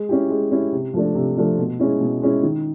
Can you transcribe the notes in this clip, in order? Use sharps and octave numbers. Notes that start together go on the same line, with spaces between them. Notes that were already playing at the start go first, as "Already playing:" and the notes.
Already playing: G#3
C#4 E4 G4
G#3
C#4 E4 G4
C3
F3 A3 D4
C3
F3 A3 D4
B2
G#3 C#4 E4
B2
G#3 C#4 E4
D#3